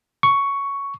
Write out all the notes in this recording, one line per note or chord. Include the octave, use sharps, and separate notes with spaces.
C#6